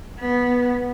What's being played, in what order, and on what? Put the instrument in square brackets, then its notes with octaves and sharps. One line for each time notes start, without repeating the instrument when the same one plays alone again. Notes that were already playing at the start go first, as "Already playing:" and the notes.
[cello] B3